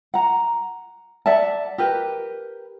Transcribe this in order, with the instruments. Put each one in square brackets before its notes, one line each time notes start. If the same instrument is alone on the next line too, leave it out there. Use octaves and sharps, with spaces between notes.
[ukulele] F#5 A#5
D5 E5 F#5 A5
G4 A#4 B4